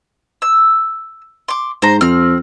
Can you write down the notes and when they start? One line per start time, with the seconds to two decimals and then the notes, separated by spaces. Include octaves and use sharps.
0.42 E6
1.48 C6 D6
1.82 G#2 C5 A#5
2.01 F2 C4 F6